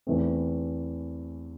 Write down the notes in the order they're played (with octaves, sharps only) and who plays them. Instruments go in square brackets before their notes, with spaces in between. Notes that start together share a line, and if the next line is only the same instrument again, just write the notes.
[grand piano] E2 E3 A3 C4